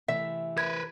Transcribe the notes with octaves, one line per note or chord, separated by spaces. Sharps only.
C3 E3 A3 E5
A#4 B4 G#6